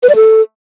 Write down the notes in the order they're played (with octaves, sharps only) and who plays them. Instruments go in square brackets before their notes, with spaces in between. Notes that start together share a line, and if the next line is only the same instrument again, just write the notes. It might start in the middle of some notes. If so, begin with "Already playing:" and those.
[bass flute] B4
D5
A4